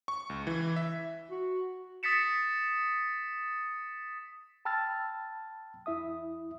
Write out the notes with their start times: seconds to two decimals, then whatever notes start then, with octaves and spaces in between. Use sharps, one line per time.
0.08 C#6
0.30 C#2
0.47 E3
0.76 E5
1.31 F#4
2.03 D#6 A6 B6 C#7 E7
4.65 G5 A5 B5 E6 F6 A6
5.86 E2 E4 E5 D#6